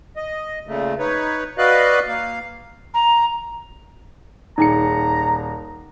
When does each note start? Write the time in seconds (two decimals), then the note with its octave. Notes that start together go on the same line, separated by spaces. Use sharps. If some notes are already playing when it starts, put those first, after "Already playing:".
0.16 D#5
0.67 A#2 C#3 A3
0.99 D#4 B4 C#5
1.58 F#4 B4 D5 D#5 F5 F#6
2.08 A#3 F5
2.94 A#5
4.58 D#1 D#4 G#4 A#5 C#7